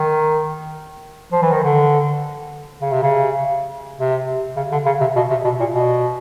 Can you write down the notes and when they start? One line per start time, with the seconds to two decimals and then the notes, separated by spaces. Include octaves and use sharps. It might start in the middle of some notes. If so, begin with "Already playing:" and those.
Already playing: D#3
1.32 F3
1.42 E3
1.52 D#3
1.64 D3
2.81 C#3
2.92 C3
3.03 C#3
3.98 C3
4.56 C#3
4.72 D3
4.86 C#3
5.01 C3
5.16 B2
5.31 C3
5.44 B2
5.60 A#2
5.73 B2